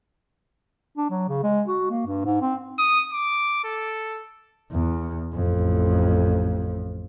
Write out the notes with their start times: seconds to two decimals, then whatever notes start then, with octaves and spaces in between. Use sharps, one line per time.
0.98 D4
1.10 F#3
1.29 C#3
1.43 G#3
1.68 F#4
1.90 A#3
2.07 G2
2.25 G#2
2.42 C4
2.79 D#6
3.13 D6
3.64 A4
4.72 E2
5.34 A1 F2